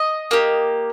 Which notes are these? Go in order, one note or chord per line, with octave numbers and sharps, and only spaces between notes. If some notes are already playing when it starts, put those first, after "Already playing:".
Already playing: D#5
A#3 G4